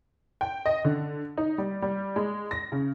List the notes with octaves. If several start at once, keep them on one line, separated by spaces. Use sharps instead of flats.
G5
D#5
D3
D#4
G3
G3
G#3
A#6
C#3